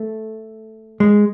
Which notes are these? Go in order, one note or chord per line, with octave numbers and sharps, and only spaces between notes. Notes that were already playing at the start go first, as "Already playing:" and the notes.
Already playing: A3
G#3